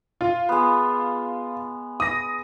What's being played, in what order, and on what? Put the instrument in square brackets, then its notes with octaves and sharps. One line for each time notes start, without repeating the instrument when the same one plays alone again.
[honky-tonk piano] F4
[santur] G#3 B3
[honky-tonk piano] D#6 A#6